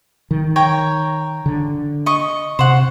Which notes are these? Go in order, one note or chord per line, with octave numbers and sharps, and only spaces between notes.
D#3
C#5 G5 A#5
D3
D#5 C#6
C3 C5 F#5